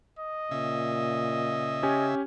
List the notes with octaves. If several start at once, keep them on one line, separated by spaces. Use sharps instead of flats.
D#5
A#2 C#3 E5
C#4 G4 G#5